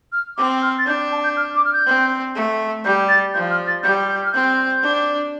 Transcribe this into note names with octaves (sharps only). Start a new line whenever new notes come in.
F6
C4 D6
F6
A6
D4 G6
A5
G6
F6
D6
F6
G6
C4
A3
G3 G6
A6
F3 G6
F6
A6
G3 G6
G6
F6
C4 G6
D4